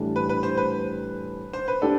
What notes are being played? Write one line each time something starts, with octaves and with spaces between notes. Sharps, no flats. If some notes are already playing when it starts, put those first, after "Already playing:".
Already playing: A2 E3 G3 D4 A4
B4
B4
C5
B4
C5
B4
D4 G4 A4 D5